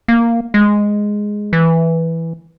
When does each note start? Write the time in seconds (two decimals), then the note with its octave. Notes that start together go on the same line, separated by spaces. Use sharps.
0.08 A#3
0.54 G#3
1.53 E3